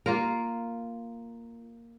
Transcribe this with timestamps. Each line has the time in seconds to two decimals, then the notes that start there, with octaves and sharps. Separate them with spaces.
0.06 A#3 F4 A#4